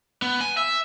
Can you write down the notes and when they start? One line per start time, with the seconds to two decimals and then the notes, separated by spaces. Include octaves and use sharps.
0.22 B3
0.41 G#5
0.57 E5